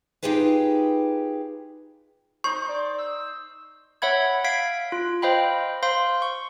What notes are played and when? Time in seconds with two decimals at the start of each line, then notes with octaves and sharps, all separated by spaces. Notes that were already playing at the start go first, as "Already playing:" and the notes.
0.23 D#4 F4 G4 G#4 B4
2.44 D#4 C5 C#6
2.69 D5
2.99 E6
4.02 C#5 E5 F#5 B5 G#6
4.44 F5 G#6 B6 D7
4.92 F4
5.22 C5 D#5 F5 G5 B5
5.83 C5 F5 C6
6.22 C#6